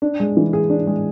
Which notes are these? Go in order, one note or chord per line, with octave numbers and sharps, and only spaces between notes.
D4
G#3
E3
G#4
D4
G#3